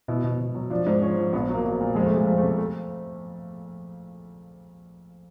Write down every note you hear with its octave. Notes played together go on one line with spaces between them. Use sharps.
B2 E4
B2
B2
F#3
F3 D4
G#2
F3 C#4
F3
A#1 B3
F#3
A#3
F#3
A#2
F2 G#3
A3
C3 G#3
F2
A3
C3
A3